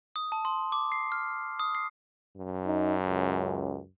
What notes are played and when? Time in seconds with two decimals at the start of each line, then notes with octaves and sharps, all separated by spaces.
0.16 D#6
0.32 A5
0.45 C6
0.72 D6
0.92 C7
1.12 F6
1.59 D#6
1.75 C7
2.37 F#2
2.66 D#4
3.05 C#2